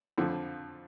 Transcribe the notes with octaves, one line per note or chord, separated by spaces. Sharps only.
F2 D3 F3